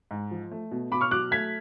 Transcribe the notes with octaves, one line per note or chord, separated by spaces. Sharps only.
G#2
F3
A3
B2
B2 B5 D6
C#6 F6
F#3 D6 F#6
A3 G#6 B6